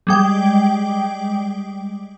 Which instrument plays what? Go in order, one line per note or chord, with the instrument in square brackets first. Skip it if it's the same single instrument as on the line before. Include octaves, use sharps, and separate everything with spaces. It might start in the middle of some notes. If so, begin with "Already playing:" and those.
[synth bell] G3 G#3 G5